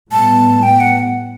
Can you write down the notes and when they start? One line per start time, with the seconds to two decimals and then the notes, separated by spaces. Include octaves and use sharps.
0.11 A2 G3 B3 A5
0.63 G5
0.80 F#5